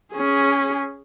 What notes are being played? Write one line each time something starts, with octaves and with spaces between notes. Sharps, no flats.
C#4 G#4